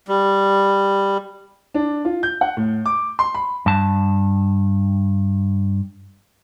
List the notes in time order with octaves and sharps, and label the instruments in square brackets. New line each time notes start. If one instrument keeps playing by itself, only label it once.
[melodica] G3
[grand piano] D4
F4
G6
F#5
A2
D6
C6
B5
[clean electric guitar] G2 A5